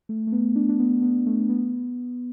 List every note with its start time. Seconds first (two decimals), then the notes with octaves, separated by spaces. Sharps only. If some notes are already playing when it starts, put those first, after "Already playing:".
0.09 A3
0.27 A3
0.32 B3
0.56 D4
0.69 D4
0.79 B3
1.02 B3
1.26 A3
1.49 B3